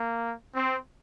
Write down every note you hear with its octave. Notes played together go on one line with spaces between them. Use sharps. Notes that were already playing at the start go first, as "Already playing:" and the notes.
Already playing: A#3
C4